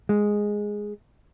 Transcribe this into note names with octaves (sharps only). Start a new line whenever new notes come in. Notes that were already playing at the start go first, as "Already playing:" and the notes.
G#3